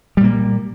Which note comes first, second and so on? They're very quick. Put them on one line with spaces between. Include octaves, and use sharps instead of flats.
G3 A#2 A#3